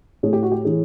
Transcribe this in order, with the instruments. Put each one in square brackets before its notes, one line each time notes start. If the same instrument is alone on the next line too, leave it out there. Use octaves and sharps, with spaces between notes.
[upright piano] A2 G#4
G4
F#4
G4
E3 G#4